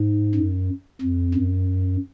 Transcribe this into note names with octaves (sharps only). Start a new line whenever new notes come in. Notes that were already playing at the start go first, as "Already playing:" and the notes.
Already playing: G#2
F#2
F2
F#2